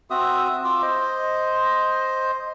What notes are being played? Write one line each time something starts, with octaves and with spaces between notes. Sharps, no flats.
C4 F#4 E5 D#6
F4 D6 E6
C5 D#5